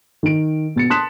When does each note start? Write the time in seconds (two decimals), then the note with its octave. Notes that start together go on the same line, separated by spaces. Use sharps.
0.23 D#3 D7
0.76 B2 A6 C#7
0.90 A5 C6 D#6 F#6 B6 E7